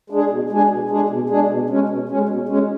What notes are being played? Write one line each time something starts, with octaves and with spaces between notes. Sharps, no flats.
G#3 D4 G#4
B2
G#3 D4 G#4
B2
G#3 D4 G#4
B2
G#3 D4 G#4
B2
G#3 C#4
B2
G#3 C#4
B2
G#3 C#4